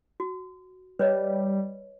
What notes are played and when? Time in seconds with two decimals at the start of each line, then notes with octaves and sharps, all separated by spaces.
0.20 F#4
0.99 G3 B4 C#5 D#5